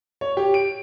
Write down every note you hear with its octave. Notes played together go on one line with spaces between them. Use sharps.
C#5
G4
D7